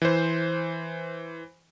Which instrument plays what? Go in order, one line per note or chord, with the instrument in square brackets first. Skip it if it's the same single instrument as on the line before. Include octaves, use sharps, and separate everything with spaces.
[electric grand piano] E3 C5